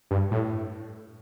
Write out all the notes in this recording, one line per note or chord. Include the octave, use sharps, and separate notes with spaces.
G2
A2